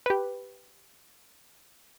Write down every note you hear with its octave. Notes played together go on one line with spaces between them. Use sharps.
G4 B4